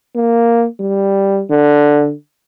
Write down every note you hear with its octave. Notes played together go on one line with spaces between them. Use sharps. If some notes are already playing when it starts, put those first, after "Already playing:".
A#3
G3
D3